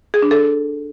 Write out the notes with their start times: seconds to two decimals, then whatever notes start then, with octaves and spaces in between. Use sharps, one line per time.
0.14 G#4
0.22 D4
0.31 A4